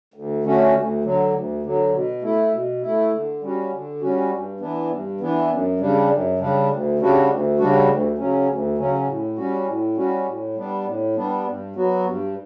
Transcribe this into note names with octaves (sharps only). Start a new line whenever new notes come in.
D2
D3 A3 C#4 F#4
D2
D3 F#3
D2
D3 F#3
B2
A3 E4
B2
A3 E4
D3
G3 C#4 F#4
D3
G3 C#4 F#4
G2
E3 B3 D4
G2
E3 B3 D4
F#2
C#3 G3 D4
F#2
C#3 G3 D4
D2
C#3 G3 D4 F#4
D2
C#3 G3 D4 F#4
D2
C#3 F#3 C#4
D2
C#3 F#3 C#4
A2
G3 C#4 F#4
A2
G3 C#4 F#4
A2
G3 B3 D4
A2
G3 B3 D4
G2
F#3 B3 F#4
G2